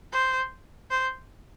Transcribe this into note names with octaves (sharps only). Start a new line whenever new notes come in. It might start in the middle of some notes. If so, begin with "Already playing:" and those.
C5
C5